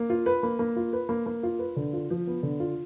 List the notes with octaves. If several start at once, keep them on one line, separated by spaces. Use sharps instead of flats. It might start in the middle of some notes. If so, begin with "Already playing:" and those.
Already playing: A#3
F4
B4
A#3
A#3
F4
B4
A#3
A#3
F4
B4
D3
F4
F3
B3
D3
F4